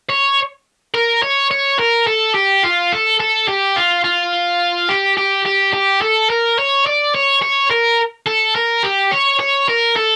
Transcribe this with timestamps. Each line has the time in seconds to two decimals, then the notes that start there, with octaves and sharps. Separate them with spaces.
0.10 C#5
0.94 A#4
1.23 C#5
1.51 C#5
1.79 A#4
2.07 A4
2.35 G4
2.63 F4
2.92 A4
3.20 A4
3.48 G4
3.76 F4
4.04 F4
4.89 G4
5.17 G4
5.45 G4
5.73 G4
6.01 A4
6.30 A#4
6.59 C#5
6.86 D5
7.15 C#5
7.42 C#5
7.71 A#4
8.27 A4
8.56 A#4
8.83 G4
9.11 C#5
9.40 C#5
9.69 A#4
9.96 A4